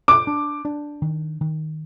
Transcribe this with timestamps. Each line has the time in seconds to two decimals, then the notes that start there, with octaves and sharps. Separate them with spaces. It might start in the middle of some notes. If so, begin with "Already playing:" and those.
0.08 D6
0.27 D4
0.65 D4
1.02 D#3
1.41 D#3